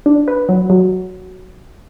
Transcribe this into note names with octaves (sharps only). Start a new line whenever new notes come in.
D4
B4
F#3
F#3